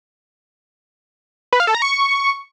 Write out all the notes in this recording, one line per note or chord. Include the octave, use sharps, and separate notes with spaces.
B4
F5
A4
A#5
C#6